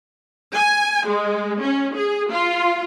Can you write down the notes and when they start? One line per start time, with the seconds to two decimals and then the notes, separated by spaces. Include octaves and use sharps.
0.55 G#5
1.07 G#3
1.63 C#4
1.95 G#4
2.31 F4